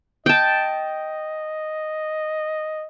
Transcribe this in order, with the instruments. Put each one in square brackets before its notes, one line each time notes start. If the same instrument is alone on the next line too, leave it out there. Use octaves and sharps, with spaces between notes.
[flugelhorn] D#5 [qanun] G5 A5